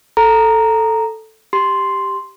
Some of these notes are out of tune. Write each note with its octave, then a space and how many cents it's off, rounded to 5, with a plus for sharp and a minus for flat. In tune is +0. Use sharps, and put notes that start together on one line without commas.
A4 +0 A#5 -5
G4 -5 C6 +0